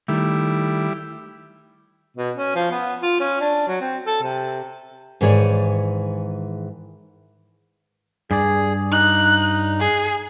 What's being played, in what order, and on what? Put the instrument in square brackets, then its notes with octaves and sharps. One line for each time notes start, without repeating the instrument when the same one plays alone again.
[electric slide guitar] D#3 A3 [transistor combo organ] G3 E4
[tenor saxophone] B2
C#4
F3
B3
F4
C#4
D4
F#3
C4
A4
C3
[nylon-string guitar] G#2 D#3 E3 G#4 C#5 D5
[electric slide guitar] G2 D5 [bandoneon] G#4
[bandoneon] D#4 [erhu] F#6
[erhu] G#4